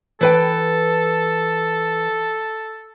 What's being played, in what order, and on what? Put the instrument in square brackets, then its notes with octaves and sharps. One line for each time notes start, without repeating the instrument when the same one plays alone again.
[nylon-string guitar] E3 B4 G5 [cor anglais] A4